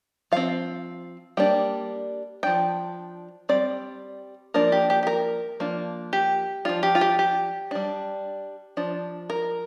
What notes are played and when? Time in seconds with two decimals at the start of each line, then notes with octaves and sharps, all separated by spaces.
0.32 F3 C4 F5
1.37 G3 A#3 D4 G5
2.43 F3 D4 G5
3.49 G3 C4 D5
4.54 F3 A#3 D4 A#4
4.72 G4
4.90 G4
5.03 G4
5.07 A#4
5.60 F3 A#3 D4
6.13 G4
6.65 F3 D4 F4
6.83 G4
6.95 F4
7.01 G4
7.19 G4
7.71 G3 D4
8.77 F3 D4
9.30 A#4